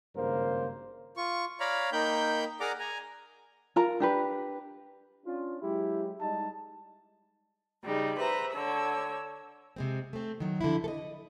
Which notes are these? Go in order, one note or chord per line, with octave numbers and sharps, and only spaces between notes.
G#1 G2 C#3 A#3 A#4 C5
F4 C#6
C#5 D5 F5 A#5 B5
A#3 D#4 G5 B5 G6
G#4 A#4 D5 F#5 A#5 D6
G#5 A#5
F4 A#4 A#5
D4 G4 B4
C#4 D4 F4
F#3 G#3 E4 G4
G3 G#3 D#4 A5
C#3 G3 D#4
B4 C5 E5 A#5
D3 C#5 E6
C3 G#3 C4
A3 C4
D#3 F#3
D3 F3 E4
A4 D#5